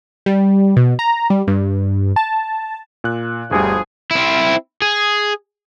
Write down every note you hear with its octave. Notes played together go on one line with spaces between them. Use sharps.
G3
B2
A#5
G3
G2
A5
A#2 F#6
G1 D2 F3 G3 G#4
C4 E4
G#4